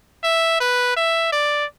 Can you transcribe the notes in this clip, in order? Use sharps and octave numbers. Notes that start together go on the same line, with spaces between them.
E5
B4
E5
D5